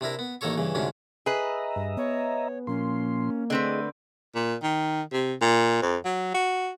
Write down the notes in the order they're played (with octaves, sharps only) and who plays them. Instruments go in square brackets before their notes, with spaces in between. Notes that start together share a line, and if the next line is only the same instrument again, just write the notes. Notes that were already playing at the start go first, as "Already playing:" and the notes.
[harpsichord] C3 D4 E4 A#4
B3
A1 D#3 A#3 A4 C#5 C#6
G2 C#3 E3
D2 G#2 C3 C#4 D4
[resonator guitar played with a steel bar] G#4 B4 [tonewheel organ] D#5 E5 A#5
[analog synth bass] G2
[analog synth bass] B3 [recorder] C#5
[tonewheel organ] A#2 F3 C6 [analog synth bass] A#3 [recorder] C#4
[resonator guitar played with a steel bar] D3 C4 B4 [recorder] A3 [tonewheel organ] G#4 D#5
[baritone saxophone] A#2
D#3
C3
A#2
F2
F#3
F#4